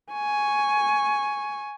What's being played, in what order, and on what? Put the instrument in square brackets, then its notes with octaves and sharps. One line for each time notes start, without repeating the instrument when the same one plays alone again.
[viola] G#5 C#6